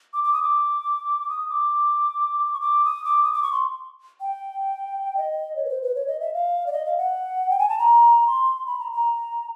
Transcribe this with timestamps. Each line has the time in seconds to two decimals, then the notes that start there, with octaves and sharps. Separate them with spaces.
0.13 D6
0.24 D6
0.33 D#6
0.43 D6
1.29 D#6
1.49 D6
2.46 D6
2.53 C#6
2.61 D6
2.85 D#6
3.04 D6
3.23 D#6
3.33 D6
3.42 C#6
3.52 C6
4.21 G5
5.17 D#5
5.56 C#5
5.65 B4
5.69 C5
5.82 B4
5.95 C#5
6.07 D#5
6.20 E5
6.34 F5
6.67 D5
6.73 D#5
6.85 F5
6.97 F#5
7.50 G5
7.59 G#5
7.69 A5
7.78 A#5
8.27 C6
8.66 B5
8.80 A#5
8.92 A#5